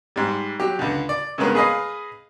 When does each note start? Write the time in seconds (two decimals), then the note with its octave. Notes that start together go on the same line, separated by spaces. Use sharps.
0.16 G#2 G3
0.60 F#3 G4
0.79 C#2 D3
1.09 D5
1.38 G2 C#3 G#3 A#3 B3 C#4
1.55 G#4 B4 D#5 F5